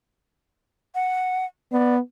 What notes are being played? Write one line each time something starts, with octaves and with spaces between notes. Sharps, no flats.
F#5
B3 D5